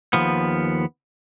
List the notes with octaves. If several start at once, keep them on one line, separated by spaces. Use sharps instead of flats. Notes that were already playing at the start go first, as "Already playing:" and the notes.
D#2 F3 B3